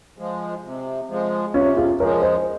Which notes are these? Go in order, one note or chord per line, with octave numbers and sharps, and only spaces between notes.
F3 G#3
C3
F3 G#3
C3 C#4 F4
F4 G#4
F3 G#3 A#4 C#5
C5 D#5